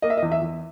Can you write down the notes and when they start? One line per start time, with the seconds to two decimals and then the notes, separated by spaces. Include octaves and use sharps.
0.02 A#3 D#5
0.10 E5
0.18 D#5
0.22 E2
0.32 E5
0.41 E2